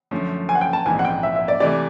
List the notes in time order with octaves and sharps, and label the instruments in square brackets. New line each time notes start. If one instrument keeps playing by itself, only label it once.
[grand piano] F#2 D3 F3 A3 C#4
[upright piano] G#5
F#5
G5
A5
[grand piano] A#1 G#2 E3 G#3 C4 [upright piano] G#5
[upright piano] F#5
G5
E5
E5
D5
[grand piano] C3 E3 A3 [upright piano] D5